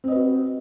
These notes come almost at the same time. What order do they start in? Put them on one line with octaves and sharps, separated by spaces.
C4 D#5 B4 F#4